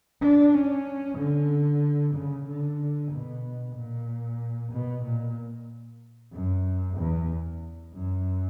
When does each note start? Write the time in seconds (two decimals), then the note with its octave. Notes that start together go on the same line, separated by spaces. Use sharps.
0.21 D4
0.54 C#4
1.18 D3
2.14 C#3
2.46 D3
3.11 B2
3.76 A#2
4.72 B2
5.05 A#2
6.32 F#2
6.98 E2
7.94 F#2